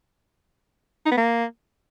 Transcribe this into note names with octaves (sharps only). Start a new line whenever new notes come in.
D#4
B3
A#3